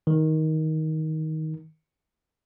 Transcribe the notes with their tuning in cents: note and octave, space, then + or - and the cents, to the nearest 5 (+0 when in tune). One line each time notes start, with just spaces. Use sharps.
D#3 +15